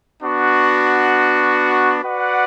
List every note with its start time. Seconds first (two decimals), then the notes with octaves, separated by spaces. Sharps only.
0.22 B3 D4 F#4
2.02 F#4 B4 D5 F#5